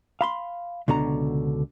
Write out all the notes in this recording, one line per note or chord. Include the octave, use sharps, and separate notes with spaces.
F5 B5 C6
C#2 B2 D3 F#4 A#5